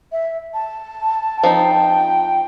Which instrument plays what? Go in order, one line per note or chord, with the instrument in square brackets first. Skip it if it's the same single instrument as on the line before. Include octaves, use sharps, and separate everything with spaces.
[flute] E5
A5
[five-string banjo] F3 C4 D#4 [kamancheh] G5